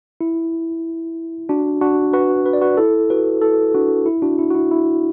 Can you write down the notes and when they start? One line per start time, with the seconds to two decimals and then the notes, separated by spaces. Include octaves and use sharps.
0.21 E4
1.49 D4 F#4
1.81 D4 F#4
2.13 F#4 B4
2.46 B4
2.53 D5
2.61 F#4 B4
2.77 E4 A4
3.10 F#4 B4
3.42 E4 A4
3.74 D4 F#4
4.06 E4
4.22 D4 F#4
4.39 E4
4.50 F#4
4.54 E4
4.71 E4